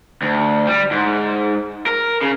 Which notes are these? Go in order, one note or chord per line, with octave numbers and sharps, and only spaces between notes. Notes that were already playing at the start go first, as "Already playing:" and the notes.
D2
G3
G#2
A#4
C#3